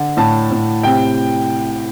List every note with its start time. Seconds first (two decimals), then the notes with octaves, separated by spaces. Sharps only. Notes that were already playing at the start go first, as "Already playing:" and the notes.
Already playing: D3
0.17 A2 A5
0.51 A2
0.83 C3 G5